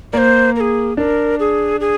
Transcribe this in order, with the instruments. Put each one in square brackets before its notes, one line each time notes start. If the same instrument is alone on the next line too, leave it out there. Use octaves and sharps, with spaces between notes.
[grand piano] A#3 [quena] C5 D5
[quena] A#4
G#4
[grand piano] D4 [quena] A#4
[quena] G#4
G#4